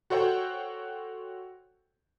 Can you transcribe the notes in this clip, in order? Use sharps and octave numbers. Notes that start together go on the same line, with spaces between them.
F#4 A4 C5 C#5 F#5 G5